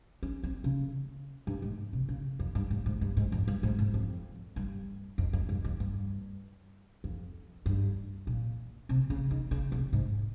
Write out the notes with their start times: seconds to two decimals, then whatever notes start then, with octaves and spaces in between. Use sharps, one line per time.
0.23 C#4
0.43 C4
0.64 C#3
1.47 G2
1.62 G#2
1.93 C3
2.09 C#3
2.39 F2
2.55 G2
2.71 G#2
2.86 G#2
3.01 G2
3.17 G#2
3.32 F2
3.48 G2
3.63 G#2
3.79 G#2
3.94 F2
4.56 G2
5.18 F2
5.33 F2
5.49 G2
5.65 F2
5.80 G2
7.04 F2
7.66 G2
8.27 A#2
8.89 C3
9.10 C#3
9.31 D#3
9.51 C#3
9.72 C3
9.93 G#2